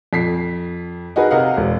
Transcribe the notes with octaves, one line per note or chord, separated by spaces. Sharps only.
F2 B6 C7
D#4 F#4 G#4 A#4 B4
C3 A#4 D#5 F5 F#5
E1